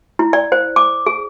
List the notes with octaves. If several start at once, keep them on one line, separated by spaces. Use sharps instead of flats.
E4
D5
C5
D6
G#4